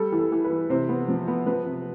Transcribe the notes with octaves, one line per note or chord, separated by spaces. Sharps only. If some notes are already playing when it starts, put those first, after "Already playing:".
Already playing: G3 A4
E3
A4
E3
B4
E3
C3 C5
B3
F3
B3
F3 B4
C3